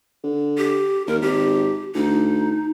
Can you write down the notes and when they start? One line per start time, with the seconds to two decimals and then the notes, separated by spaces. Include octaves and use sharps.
0.24 D3
0.58 G4
1.07 D#2 A#4
1.22 G#1 G4
1.95 D2 D#4